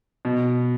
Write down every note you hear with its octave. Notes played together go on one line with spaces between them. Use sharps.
B2